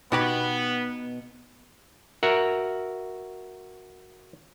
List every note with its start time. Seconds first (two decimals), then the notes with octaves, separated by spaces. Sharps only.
0.12 B2 B3 D#4 F#4 G4 B4 G#6
2.23 F#4 A#4 E5 F#5